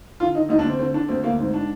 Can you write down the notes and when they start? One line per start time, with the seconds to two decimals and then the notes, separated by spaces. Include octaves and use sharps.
0.20 D3 F4
0.35 D3 D#4
0.49 D2 D#4
0.59 D4
0.65 D2 C4
0.79 D3 C4
0.94 D3 D4
1.08 D2 C4
1.24 D2 A#3
1.38 G#2 C4
1.54 D4